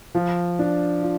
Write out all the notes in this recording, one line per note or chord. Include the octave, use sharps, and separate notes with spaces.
F3
D4
F4